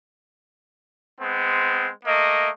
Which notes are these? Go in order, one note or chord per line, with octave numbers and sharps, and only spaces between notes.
G#3 B3 C4
A3 A#3 D#5